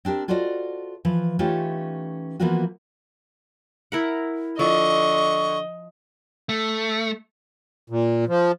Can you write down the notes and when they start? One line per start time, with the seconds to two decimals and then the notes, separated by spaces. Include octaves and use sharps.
0.05 C4 D4 G4 A#4
0.28 F4 F#4 A4 C5 D5 D#5
1.05 E3 F3
1.39 E3 A3 C#4 D#4 F4 G4
2.40 E3 F3 A#3 B3 F4 F#4
3.92 E4 A#4 F#5
4.59 D3 F3 D#5 C#6
6.49 A3
7.90 A#2
8.28 F3